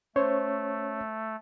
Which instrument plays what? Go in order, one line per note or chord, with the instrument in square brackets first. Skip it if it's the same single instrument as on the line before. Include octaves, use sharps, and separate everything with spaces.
[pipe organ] A3 [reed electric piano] C#4 C#5 [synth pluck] C5